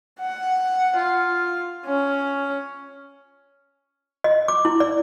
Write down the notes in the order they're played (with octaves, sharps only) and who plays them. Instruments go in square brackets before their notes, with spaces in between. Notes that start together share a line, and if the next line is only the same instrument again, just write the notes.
[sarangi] F#5
F4
C#4
[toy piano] D#5
D6
E4
D5